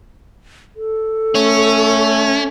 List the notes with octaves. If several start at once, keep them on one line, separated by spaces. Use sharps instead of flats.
A4
A3 C#4